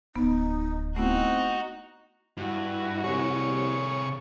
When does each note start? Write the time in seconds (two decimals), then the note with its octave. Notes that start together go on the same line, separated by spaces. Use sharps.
0.16 D1 B3 D#4
0.96 A3 B3 C4 D#4 E4 F#4
2.37 G2 E4 F#4
3.04 C2 C3 G#4 C#5